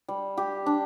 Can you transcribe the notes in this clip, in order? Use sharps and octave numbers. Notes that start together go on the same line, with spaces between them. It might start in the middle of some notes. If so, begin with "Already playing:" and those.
G3
G4
D4